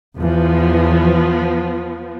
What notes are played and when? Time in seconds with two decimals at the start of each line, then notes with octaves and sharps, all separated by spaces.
0.17 E2 E3 F3 B3